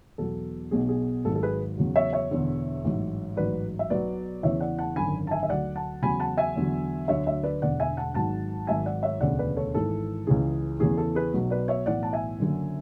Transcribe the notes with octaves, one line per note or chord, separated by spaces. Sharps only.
E2 B2 F#3 A4
B1 B2 F#3 G#4
G#4
G#1 G#2 F#3 A4
A4
G#4 B4
E2 C#3 F#3
C#5 E5
C#5 E5
E1 E2 D3
A1 G#2 F#3
A1 G#2 F#3 B4 D5
E5
B1 B2 F#3 B4 D5
E2 C#3 E3 C#5 E5
D5 F#5
F#5 A5
G#1 F#2 D3 G#5 B5
A5
E5 G#5
E5
D2 D3 F#3 D5 F#5
F#5 A5
E2 C#3 F#3 G#5 B5
F#5 A5
E5 G#5
E2 D3 F#3
D2 D3 F#3 C#5 E5
C#5 E5
B4 D5
E1 E2 D3 D5 F#5
E5 G#5
F#5 A5
G#1 G#2 F#3 F#5 A5
G#1 G#2 F#3 E5 G#5
D5 F#5
C#5 E5
E1 D2 C#3 D5 F#5
B4 D5
A4 C#5
G#1 G#2 E3 A4
C#2 C#3 E3 G#4
E2 C#3 E3 G#4
A4
G#4 B4
B1 B2 F#3
B4 D5
C#5 E5
B1 A2 E3 D5 F#5
A5
E5 G#5
F#1 F#2 D3 F#3